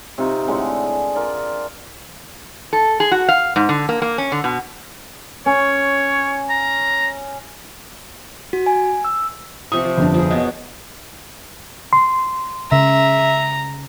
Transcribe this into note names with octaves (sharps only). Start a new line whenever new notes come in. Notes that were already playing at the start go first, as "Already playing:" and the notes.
C3 D#4 F4 C#6
A2 D3 G#3 F#5
G#4
F4 A#4 D5
A4
G#4
F#4
F5
G#2
D3
A#3
A#3
C#4
D3
B2
C#4 C#5
A#5
F#4
G#5
E6
C3 F3 C#6 D#6
F3
G1 F2 D4
F3 G#4
B2 F#3 D#5
C6
C#3 E5 A#5